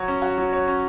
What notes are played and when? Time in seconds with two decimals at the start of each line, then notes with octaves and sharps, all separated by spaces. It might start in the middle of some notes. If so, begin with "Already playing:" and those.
Already playing: F#3 F#4 C#5
0.08 C#4
0.22 F#4
0.38 F#3
0.53 C#5
0.68 C#4